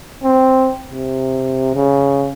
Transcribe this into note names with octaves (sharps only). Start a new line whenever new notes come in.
C4
C3
C#3